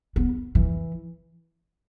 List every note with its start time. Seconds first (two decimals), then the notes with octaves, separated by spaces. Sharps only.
0.16 B3
0.55 E3